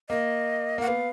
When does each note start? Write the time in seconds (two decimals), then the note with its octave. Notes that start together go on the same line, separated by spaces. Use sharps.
0.09 A#3 D#5
0.78 A#3 F#5
0.88 B3 F5